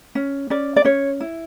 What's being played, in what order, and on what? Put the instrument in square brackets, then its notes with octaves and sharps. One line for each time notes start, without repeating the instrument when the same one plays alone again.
[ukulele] C#4
C#4 D5
D5
C#4 C#5
E4